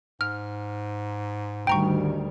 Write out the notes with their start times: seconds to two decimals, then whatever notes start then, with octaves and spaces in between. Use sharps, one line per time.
0.21 G#2 F6
1.67 D2 D#3 G3 G5 A#5 C#6